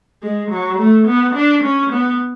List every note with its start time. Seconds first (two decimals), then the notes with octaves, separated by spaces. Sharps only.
0.22 G#3
0.50 F#3
0.79 A3
1.07 B3
1.35 D4
1.63 C#4
1.92 B3